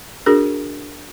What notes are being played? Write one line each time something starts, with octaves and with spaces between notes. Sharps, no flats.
D4 F#4 G#4 A#4